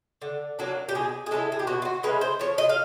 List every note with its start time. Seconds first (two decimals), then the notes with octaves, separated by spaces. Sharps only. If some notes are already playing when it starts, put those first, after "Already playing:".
0.22 D3
0.59 F#3 A#3 D4
0.89 G4
0.95 B2 G#4
1.26 G#4
1.31 G#3 C#4 E4 A4
1.52 G#4
1.59 G4
1.67 B2 F#4
1.82 F4
1.85 F#4
2.03 G#3 C#4 E4 B4
2.21 C5
2.39 F3 C#5
2.58 D#5
2.69 F5